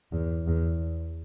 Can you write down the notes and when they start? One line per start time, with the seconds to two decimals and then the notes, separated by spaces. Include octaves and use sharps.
0.12 E2
0.47 E2